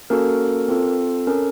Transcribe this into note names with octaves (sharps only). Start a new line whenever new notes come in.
A#3 C#4 F#4 A4 A#4
C4 F4 A4
C#4 A4 A#4